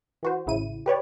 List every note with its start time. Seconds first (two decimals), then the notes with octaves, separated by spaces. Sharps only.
0.23 E3 F#4 C5
0.46 A1 C#3 E4 D#7
0.86 G4 B4 C#5 D5